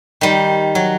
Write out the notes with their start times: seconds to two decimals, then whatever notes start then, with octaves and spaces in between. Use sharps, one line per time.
0.21 D#3 G3
0.75 F#3